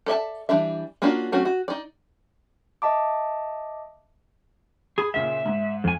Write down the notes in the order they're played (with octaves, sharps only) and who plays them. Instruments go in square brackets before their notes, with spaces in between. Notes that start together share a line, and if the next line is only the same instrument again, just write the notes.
[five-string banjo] A4 D5 E5 A5
E3 G3 D4 E5
A#3 C#4 D4 F4 F#4
F#3 A3 C4 C#4 F#4
F#4
D#4 D5
[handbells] D#5 E5 A5 D6
[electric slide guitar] G#4 [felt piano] B5
[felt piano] A#2 C#3 A#3 [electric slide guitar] E5
[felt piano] G#2
[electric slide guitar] F2 G#5